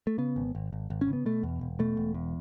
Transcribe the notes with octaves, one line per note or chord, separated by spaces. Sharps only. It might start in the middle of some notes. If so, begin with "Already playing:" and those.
A3
C#3 B3
G#1
G#1
G#1
G#1
C#4
C#3
B3
B2 A3
E2
E1
B2 A3
E1
E2